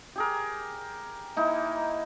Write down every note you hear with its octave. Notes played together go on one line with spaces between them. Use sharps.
G4 G#4 A#4
A#3 D#4 E4